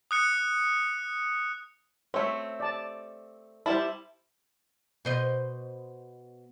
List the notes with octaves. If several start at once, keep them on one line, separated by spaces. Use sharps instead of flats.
D#6 F#6 C#7
A3 C4 C#5 E5
D5 A5
G3 E4 C5 A5
B2 C5 D#5